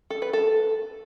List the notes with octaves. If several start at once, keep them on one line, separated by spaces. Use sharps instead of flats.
A4
B4
A4